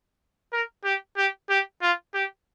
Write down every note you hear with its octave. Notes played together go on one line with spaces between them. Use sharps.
A#4
G4
G4
G4
F4
G4